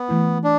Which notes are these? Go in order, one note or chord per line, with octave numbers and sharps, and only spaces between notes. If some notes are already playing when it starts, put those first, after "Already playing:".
Already playing: B3
E3 A3 E4
D4